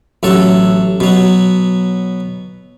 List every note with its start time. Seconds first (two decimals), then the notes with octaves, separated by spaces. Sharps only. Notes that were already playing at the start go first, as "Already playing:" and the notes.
0.23 A1 F#3 A4
1.00 B2 F#3